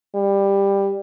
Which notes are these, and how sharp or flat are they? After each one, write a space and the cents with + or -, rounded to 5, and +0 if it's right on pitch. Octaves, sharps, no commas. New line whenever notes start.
G3 +15